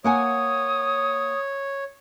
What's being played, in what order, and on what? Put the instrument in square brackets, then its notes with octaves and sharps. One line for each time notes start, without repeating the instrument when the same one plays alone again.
[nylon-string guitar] A#3 F#5 G#5 [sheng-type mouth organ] C#5 [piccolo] D#6